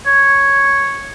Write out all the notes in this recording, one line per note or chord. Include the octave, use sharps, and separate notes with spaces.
C#5